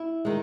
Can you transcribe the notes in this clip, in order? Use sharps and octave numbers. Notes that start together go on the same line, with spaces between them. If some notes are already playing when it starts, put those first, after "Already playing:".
Already playing: E4
D#3 G#3